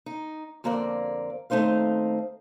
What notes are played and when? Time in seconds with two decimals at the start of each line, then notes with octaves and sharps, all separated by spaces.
0.06 D#4
0.64 F2 D3 A#3 C4 A#4 D5
1.50 D#2 A3 C4 D#4 C5 F5